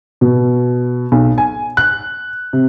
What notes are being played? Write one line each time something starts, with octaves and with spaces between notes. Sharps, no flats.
B2
B1
G#5
F#6
C3